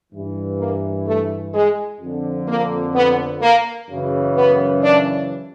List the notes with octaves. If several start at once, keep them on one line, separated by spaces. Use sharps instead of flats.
G2 E3
A#3
A3
G#3
F2 D3
A#3
B3
A#3
F#2 C#3 E3
B3
D4